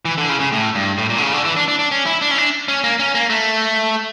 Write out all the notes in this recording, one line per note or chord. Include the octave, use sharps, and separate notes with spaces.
E3
D3
C#3
C#3
A2
G2
A2
A#2
D3
C#3
D3
E3
D4
D4
D4
C#4
E4
D4
C#4
D4
C#4
A#3
C#4
A#3
A3